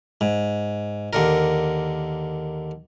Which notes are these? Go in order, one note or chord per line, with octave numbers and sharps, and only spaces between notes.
G#2
D#2 D3 A#4